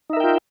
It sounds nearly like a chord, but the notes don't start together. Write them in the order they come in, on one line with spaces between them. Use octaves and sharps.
D#4 E5 A#4 G5 F4